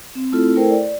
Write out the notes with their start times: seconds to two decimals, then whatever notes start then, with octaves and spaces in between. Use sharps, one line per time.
0.15 C4
0.32 A3 C4 E4 F4 A4
0.56 A3 E4 A4 A#4 C5 G5
0.70 D5